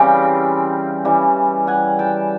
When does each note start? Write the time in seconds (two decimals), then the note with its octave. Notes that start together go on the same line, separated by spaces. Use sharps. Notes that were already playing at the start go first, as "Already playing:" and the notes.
Already playing: C#3 E3 G3 C4 F5 G5
1.05 C#3 E3 G3
1.67 F#5 G#5
1.99 G5 A5